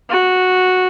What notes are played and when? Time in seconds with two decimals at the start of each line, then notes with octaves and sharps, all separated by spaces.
0.10 F#4